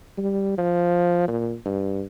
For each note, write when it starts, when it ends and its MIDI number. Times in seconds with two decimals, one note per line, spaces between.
0.18 0.54 55
0.58 1.26 53
1.28 1.55 46
1.66 2.04 43